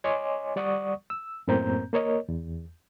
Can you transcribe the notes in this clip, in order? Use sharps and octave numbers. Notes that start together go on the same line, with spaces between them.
C#5 D#5 G#5 C6 D6
G3 D5 F#5 C#6 D#6
E6
F#2 A2 A#3 C4 A#5 G6
A#3 A#4 C#5 D#5
E2